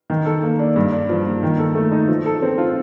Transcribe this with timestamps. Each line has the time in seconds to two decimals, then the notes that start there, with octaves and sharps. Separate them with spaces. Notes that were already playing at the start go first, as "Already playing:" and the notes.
0.10 D#3
0.26 A4
0.43 A#3
0.59 D4
0.76 G2
0.92 D4
1.09 F3
1.26 A#3
1.43 D#3
1.59 A4
1.75 A3
1.92 D#4
2.08 F3
2.26 A4
2.42 C4
2.58 F4